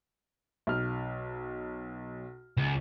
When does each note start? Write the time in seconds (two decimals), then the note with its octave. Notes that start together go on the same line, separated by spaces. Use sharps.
0.67 B1 F6
2.58 C#2